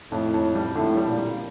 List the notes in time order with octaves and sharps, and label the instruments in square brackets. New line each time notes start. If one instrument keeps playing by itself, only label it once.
[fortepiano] F2 [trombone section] A2
[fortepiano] F2
G3
[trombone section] A2 [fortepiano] D3
[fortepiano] G3
[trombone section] A#2
[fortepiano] G3